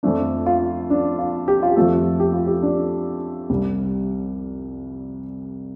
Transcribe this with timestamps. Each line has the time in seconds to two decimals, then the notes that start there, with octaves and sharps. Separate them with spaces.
0.03 F2 F3 A3 D4
0.46 F4
0.90 D4
1.19 F4
1.48 G4
1.63 F4
1.69 G4
1.76 F2 F3 A3 A4
2.20 G4
2.34 F4
2.47 G4
2.63 D4
3.50 C2 C3 G3